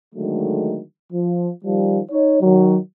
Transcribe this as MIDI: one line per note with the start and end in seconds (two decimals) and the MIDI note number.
0.14 0.81 50
0.14 0.81 51
0.14 0.81 54
0.14 0.81 56
0.14 0.81 57
1.12 1.51 53
1.64 1.99 51
1.64 1.99 53
1.64 1.99 55
2.11 2.40 63
2.11 2.40 73
2.41 2.77 51
2.41 2.77 54